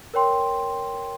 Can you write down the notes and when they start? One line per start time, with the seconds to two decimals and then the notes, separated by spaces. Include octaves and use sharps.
0.14 A#4 C#5 G5 C6